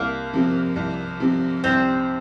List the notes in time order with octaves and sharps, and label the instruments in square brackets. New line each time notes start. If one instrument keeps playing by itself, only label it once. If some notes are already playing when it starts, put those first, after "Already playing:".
Already playing: [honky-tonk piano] C2 [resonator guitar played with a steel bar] A#3
[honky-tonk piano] C3 F3 C4
C2
C3 F3 C4
[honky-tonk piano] C2 [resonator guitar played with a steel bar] C4